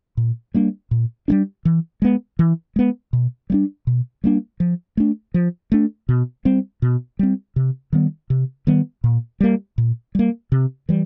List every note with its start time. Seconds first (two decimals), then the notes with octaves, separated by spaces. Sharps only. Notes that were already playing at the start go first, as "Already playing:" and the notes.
0.17 A#2
0.54 G3 A#3 D4
0.91 A#2
1.28 G3 A#3 D4
1.65 E3
2.02 G#3 B3
2.39 E3
2.76 G#3 B3
3.13 B2
3.50 G3 A#3 D4
3.87 B2
4.24 G3 A#3 D4
4.60 F3
4.97 A3 D4
5.34 F3
5.72 A3 D4
6.09 B2
6.45 G3 C4
6.82 B2
7.19 G3 C4
7.56 C3
7.93 D#3 G3 B3
8.30 C3
8.67 D#3 G3 B3
9.04 A#2
9.40 G3 A#3
9.78 A#2
10.15 G3 A#3
10.52 C3
10.89 E3 G3